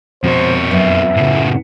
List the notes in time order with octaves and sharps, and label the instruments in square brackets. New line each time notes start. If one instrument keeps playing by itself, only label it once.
[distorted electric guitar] F2 C#5 [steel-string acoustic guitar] B2 [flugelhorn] C5
[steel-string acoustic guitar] F#2 B3 [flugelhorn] E5
[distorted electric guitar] A2 C#3